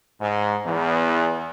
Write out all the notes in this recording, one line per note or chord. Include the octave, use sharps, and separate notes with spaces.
G#2
E2